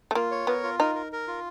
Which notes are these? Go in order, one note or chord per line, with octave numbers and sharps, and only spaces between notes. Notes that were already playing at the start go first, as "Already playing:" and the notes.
A3
A#3 F4
C#5
B3 A#4
F4
D#4 A#4
A#4
A#4
F4